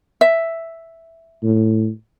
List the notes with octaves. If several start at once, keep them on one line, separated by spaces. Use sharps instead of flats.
E5
A2